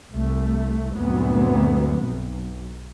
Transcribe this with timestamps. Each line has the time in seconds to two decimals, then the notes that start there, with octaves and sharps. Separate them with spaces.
0.14 C2 A3
0.96 D2 G2 A#2 F#3 B3 C4
2.04 B1